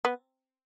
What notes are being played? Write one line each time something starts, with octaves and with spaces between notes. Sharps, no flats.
B3